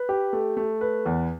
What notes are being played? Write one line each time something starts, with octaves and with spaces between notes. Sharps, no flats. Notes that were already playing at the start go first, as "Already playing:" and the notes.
Already playing: B4
G4
A3
A3
B4
E2